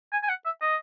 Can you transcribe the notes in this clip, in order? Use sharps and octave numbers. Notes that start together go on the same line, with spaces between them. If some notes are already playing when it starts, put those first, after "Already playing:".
G#5
G#5
F#5
E5
D#5